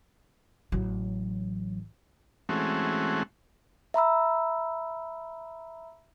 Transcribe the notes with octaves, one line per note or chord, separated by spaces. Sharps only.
A1 F#3
E3 G#3 A3 C4 C#4 F#4
E5 A#5 B5 E6